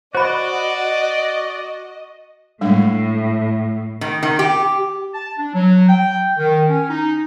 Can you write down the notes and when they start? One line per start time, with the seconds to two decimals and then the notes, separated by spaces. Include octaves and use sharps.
0.15 F#4 C5 D5 D#5 B5
2.61 A2 G3 G#3 D4
4.01 D#3
4.23 D#3
4.39 G4
5.14 A5
5.39 D4
5.54 F#3
5.89 G5
6.38 D#3
6.69 C#4
6.89 D#4